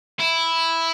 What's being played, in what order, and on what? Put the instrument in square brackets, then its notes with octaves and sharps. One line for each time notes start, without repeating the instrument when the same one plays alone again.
[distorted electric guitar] E4